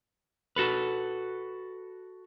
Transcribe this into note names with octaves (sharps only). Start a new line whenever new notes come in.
F#4 A4 B4